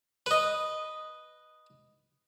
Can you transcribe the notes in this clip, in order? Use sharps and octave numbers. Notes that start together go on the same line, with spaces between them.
B4 D#5